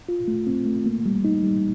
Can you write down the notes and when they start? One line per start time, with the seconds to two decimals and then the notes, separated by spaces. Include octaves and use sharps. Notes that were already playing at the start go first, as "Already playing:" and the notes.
0.09 F4
0.28 A3
0.47 C4
0.66 A3
0.86 A#3
1.06 G3
1.25 D#4
1.43 G3